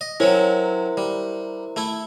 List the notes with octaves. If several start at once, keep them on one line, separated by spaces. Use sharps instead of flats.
D#5
F#3 C4 C#4 E4 A#4 C5
G3
A3 E4